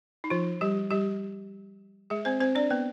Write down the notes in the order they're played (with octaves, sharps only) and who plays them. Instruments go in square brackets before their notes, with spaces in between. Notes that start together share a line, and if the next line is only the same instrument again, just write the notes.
[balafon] D#4
F3 F4
G3 G4
G3 G4
G#3 G#4
C4 C5
C4 C5
D4 D5
B3 B4